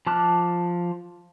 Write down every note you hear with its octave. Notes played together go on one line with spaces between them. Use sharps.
F3 A5 D6 F6 F#6